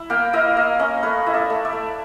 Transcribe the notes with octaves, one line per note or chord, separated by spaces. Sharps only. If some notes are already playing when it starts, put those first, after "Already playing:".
Already playing: E4
A#3 F5 G5
E4 D#5 F5
A#3 D#5 F5
C#4 C#5 D#5
A3 B4 C#5
E4 D#5
D5 E5
A3
D5 E5
A3